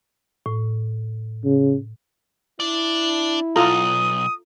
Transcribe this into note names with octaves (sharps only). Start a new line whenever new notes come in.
A2
C#3
D4 E4 D5
B1 F4 A4 A#5 D#6